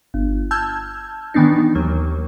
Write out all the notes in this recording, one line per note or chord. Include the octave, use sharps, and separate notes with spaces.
G1
A5 E6 F6 G6 G#6
D#3 E3 B3 D4 D#4
D#2 F#3 A#3